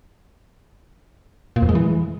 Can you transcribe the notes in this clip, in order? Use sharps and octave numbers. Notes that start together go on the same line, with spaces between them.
A#2
F2
G#3
E3